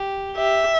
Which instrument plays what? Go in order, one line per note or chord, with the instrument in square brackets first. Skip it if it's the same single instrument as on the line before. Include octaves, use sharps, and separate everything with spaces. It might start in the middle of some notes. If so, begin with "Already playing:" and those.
Already playing: [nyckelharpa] G4
[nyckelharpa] G4 [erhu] E5